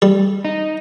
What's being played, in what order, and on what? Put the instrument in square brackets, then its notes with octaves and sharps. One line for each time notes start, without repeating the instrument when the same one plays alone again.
[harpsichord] G3
[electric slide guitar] D#4